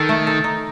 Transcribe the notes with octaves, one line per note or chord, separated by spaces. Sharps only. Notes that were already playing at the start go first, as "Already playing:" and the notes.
Already playing: D#3 A4
A3
A4
D#4